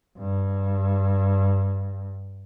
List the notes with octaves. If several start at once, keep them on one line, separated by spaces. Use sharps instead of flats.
G2